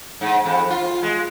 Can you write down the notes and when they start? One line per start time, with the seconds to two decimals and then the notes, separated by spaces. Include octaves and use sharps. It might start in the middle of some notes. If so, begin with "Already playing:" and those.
0.21 G#2
0.45 F2
0.70 F4
1.03 G#3